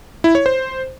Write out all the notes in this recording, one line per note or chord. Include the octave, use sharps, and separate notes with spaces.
E4
C#5
C5